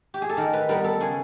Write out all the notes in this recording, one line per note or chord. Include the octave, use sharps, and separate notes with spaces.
G4
G#4
A4
D#3 A#4
B4
G3 B3 A#4
A4
C#3 G#4